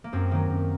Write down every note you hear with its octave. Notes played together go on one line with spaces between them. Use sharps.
A#3
F#2 C4
D#3 F#3 A#3
F#2